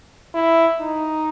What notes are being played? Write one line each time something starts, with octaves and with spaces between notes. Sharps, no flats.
E4
D#4